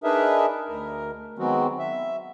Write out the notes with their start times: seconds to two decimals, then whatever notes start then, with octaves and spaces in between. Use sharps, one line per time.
0.04 D4 D#4 G#4 A#4 B4 E5
0.68 D2 A#4
1.39 D#3 F#3 G#3 B3 C4 F#4
1.79 E5